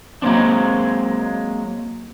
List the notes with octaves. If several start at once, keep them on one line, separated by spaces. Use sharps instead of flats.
F#3 G#3 A#3 C4 D4